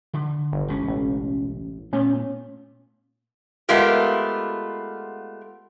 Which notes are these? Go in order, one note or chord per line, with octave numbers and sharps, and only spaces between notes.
D3
G1
E1 C#2 C#4
A1
A#2 A3 B3 C#4
G#3 A3 B3 F4 G4 A#4